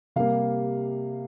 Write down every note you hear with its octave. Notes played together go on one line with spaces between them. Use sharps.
C3 G3 A#3 F5